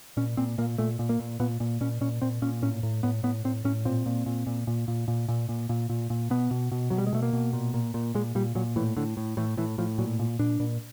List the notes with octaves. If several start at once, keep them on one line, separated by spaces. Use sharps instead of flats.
A#2 C#4
A#2 C4
A#2 A#3
A#2 A3
A#2
A#3
A#2
A#2 B3
A#2
A#2 C#4
A#2 C#4
A#2 C4
A#2 C#4
A2 C#4
A2
A2 B3
A2 B3
A2 C4
A2 C#4
A#2 C4
A#2
A#2
A#2
A#2
A#2
A#2
A#2
A#2
A#2
A#2
A#2
B2 B3
B2
B2
B2 F#3
G3
G#3
B2 A3
A#3
B2
A#2
A#2
A#2
A#2 G#3
A#2 G3
A#2 F#3
A2 E3
A2 D3
A2
A2 E3
A2 E3
A2 F3
A#2 F#3
A#2
A#2 D4
A#2